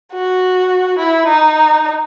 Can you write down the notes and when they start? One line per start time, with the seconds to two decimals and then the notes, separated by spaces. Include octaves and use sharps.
0.13 F#4
0.98 E4
1.28 D#4